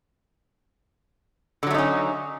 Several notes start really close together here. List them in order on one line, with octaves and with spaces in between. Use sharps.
D3 F#3 A3 D#4 C#4